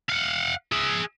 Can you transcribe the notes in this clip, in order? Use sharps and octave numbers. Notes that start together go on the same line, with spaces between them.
F5 F#5
G#4 E5